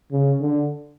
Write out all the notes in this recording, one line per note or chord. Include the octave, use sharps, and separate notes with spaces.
C#3
D3